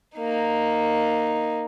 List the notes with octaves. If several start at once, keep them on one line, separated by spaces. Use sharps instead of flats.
A#3 D#4